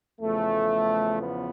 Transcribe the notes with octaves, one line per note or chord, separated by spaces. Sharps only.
E2 C#3 F3 A3
B3